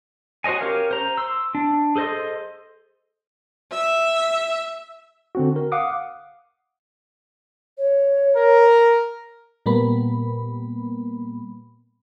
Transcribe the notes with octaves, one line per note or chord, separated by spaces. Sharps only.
F#4 C5 C#5 D#5 G#5
C#4 G4 A#4 C#5 F5
C5 A#5
C6 E6
D4
G#4 A4 C5 D#5 C6
E5
D3 C4 F#4
A#4
F5 F#5 D6 D#6
C#5
A#4
A#2 G3 A#3 B3 B5